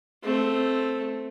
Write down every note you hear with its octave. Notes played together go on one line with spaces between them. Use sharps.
A3 C4